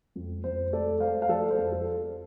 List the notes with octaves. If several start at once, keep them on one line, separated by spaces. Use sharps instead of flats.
F2
F2 C5
A3 A4 D5
A3 C5 F5
F5
F3 A4 D5
C5
F2
A4